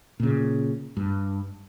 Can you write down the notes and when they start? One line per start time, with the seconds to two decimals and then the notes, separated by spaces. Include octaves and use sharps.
0.20 A#2 C#3
0.97 G2